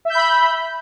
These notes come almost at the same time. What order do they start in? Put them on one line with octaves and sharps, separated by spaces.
E5 G6 B5